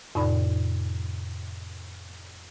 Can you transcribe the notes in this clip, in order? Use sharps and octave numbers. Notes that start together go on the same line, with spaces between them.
F2 A2 C3 D#4 D5 B5